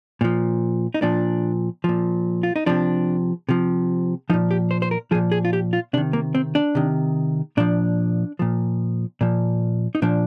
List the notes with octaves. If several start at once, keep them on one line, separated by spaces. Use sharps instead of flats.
A#2 F3
D#4
A#2 F3 D4
A#2 F3
F4
D#4
C3 F3 D4
C3 F3
A#2 F3 D#4
G4
C5
C5
A#4
A#2 F3 G#4
G#4
F4
G4
F4
C3 D#3 D4
A#3
C4
D4
C3 D#3
A#2 F3 D4
A#2 F3
A#2 F3
D#4
A#2 F3 D4